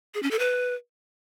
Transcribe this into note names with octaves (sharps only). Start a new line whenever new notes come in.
G#4
C#4
A4
B4